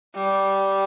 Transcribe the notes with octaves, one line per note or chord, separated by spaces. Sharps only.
G3